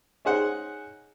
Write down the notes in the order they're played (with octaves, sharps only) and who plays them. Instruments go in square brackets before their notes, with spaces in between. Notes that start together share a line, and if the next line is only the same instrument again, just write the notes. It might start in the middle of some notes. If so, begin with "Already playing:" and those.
[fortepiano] C#4 D#4 G#4 C5 F#5